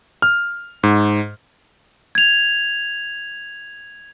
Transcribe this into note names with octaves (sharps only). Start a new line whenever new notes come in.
F6
G#2
G#6 F7